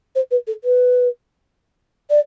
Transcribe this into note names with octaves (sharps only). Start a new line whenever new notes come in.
C5
B4
A4
B4
D5